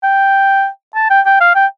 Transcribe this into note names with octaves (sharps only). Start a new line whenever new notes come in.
G5
A5
G5
G5
F5
G5